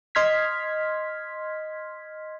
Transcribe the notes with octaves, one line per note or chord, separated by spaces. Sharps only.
D#5 C6 F6 G#6 B6